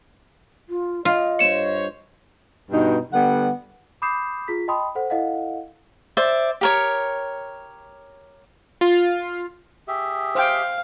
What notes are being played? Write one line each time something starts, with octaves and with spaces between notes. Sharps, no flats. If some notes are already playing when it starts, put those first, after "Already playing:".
F4
F4 D#5
G2 C5 C#5 C#7 E7
G2 B2 D#4
D3 G3 B3 F#5
B5 D6 D#6 G6 C7 E7
F4 G#4 B6
D#5 G5 A5 B5 C6 D#6
A4 C5 F#5
E4 A4 D#5 F5 F#5
C5 D5 E5
G4 A#4 C#5
F4
G4 G#4 E5
C5 F5 G5